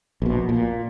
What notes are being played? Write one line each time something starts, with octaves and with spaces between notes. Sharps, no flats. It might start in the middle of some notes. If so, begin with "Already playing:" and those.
A#1 B2
A#2